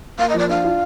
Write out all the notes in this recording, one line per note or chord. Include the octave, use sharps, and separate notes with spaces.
A#3 F5
D#5
F3 D5
D4 F5
F4